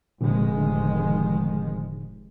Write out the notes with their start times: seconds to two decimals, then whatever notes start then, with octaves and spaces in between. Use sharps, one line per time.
0.21 F1 A#2 D3 D#3 F#3 G#3
0.54 A2 D3